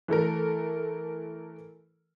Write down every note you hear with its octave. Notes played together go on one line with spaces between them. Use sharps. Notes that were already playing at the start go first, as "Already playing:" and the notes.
E3 A3 A4 A#4